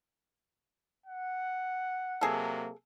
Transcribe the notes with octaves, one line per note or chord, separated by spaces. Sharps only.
F#5
C3 F#3 A#3 G#4 A4